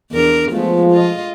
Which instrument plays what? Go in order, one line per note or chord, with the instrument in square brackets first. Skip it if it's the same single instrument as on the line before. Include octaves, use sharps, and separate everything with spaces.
[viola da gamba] E2 D4 A#4
[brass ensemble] F3 [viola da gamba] G#3 A3 B3
[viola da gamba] F4 D#5